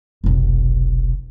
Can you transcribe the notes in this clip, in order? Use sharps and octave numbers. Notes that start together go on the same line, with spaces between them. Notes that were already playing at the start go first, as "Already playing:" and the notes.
F1 B1